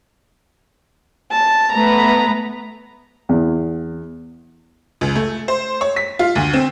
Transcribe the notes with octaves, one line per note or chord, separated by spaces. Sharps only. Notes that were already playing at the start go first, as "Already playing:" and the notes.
A5
A3 B3 B4 A#5
E2
C#2
A3
C5
C#5
B6
F4
D2
C4